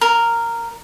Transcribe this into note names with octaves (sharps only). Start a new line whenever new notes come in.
A#4